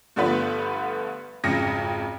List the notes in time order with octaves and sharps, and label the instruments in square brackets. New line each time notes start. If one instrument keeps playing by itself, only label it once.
[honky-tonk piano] G2 D3 F3 A3 B3 B4
G#1 F2 C#3 A#6 C#7